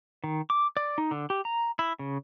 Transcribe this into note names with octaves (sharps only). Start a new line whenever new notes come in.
D#3
D6
D5
D#4
D3
G4
A#5
E4
C#3